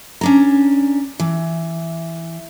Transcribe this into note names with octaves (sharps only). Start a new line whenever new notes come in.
C#4 D4 A#5
E3